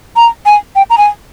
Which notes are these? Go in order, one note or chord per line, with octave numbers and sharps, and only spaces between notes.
A#5
G#5
G5
A#5
G#5